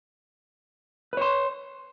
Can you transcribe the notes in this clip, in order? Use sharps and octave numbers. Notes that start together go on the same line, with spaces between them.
B4 C#5 C6